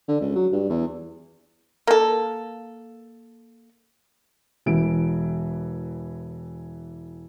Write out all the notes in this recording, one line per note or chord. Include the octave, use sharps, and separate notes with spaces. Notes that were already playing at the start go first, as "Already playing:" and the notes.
D3
C#2
F#3
G2
E2
A#3 A4
E1 E3 D7